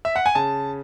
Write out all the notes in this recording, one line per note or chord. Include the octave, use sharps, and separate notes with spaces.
E5
F#5
G#5
C#3 A5